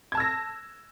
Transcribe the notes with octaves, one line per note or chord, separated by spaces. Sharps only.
A5 E6 G#6 A#6